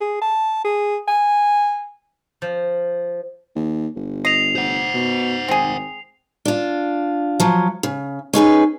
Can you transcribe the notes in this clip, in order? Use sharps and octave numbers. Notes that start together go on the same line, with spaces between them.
G#4
A5
G#4
G#5
F3
D#2
G1
D#5 C7 F7
C5 F#5
B2
G#1 C4 G#4
D4 F4
F3 F#3
C#3
C#4 D#4 G#4 B4